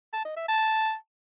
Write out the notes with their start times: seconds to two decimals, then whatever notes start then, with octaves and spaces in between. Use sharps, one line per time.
0.13 A5
0.25 D#5
0.37 E5
0.49 A5